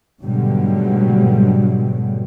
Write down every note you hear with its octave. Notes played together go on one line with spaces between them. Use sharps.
G#2 B2 D3 F#3 G3 A3